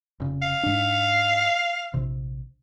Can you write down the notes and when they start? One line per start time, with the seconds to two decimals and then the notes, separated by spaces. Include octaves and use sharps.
0.20 F1 C#3
0.42 F5
0.63 G#2 D4
1.94 A#1 C3